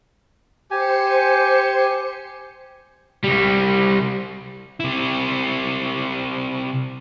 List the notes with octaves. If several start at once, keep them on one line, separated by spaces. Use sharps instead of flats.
G4 C5 G#5 C#7
C2 G3
C3 E4